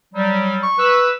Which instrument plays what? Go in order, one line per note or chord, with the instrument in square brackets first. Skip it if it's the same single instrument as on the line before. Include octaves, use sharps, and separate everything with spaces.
[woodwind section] F#3 G3
[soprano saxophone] C#6
[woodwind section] B4 E6